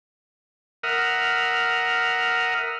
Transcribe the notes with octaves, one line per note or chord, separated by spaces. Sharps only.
A#4 E5 F#5 D#6 F6